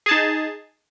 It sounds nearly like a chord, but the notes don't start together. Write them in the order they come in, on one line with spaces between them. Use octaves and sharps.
G#4 A5 D#4